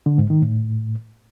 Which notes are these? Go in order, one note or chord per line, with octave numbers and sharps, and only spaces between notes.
D3
G#2
D#3
A2